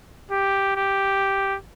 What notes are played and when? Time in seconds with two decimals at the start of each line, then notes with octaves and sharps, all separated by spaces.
0.31 G4
0.76 G4